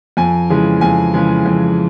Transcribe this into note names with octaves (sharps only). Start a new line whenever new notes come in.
F2 G#5
C#3 E3 G#3
F2 G#5
C#3 E3 G#3
F2